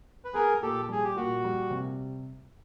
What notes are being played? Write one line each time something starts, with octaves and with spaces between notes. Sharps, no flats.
B4
B3 G#4 A#4
A#2 G4 A4
G3 G#4
G4
A#2 F#4
G3
C3